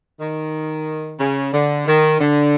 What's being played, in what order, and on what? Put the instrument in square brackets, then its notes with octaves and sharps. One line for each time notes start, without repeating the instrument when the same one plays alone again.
[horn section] D#3
C#3
D3
D#3
D3